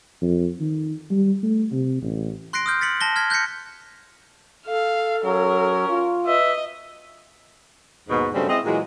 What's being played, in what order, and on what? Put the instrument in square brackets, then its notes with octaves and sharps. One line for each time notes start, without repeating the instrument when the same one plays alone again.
[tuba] F2
D#3
G3
A3
C3
A1
[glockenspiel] C6 F#6 A#6 C7 D7
D#6 F6 G6
A6 B6 C#7 F#7
A5 A#6 G7
F6 G#6 B6
F#6 G6 A#6 B6 C#7
[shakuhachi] A4 [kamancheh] F5
[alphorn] F#3 [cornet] C#4 [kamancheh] A#4
[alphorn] F4
[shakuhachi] B4 [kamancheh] D#5 [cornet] E5
[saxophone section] D#2 G#2 B2
G2 C#3 F#3 G3 A3 C4
G#3 C4 E4 D#5
A#2 E3 F#3 G#3